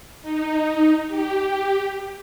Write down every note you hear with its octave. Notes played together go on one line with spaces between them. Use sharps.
D#4
G4